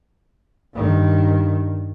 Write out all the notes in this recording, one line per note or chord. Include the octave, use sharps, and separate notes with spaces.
G2 D#3